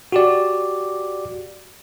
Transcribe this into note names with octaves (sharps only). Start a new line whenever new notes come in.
F#4 G4 D5